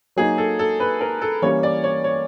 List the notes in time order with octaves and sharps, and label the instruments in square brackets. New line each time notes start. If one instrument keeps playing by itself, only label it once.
[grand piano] F#3 A#3 D#4 [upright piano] G#4
[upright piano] A4
A4
B4
A#4
A4
[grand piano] E3 G3 A#3 C#4 [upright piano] C#5
[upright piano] D5
C#5
C#5